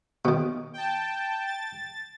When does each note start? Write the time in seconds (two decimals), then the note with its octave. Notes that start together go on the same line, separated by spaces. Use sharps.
0.25 B2 D#3
0.73 G5 A5
1.46 A6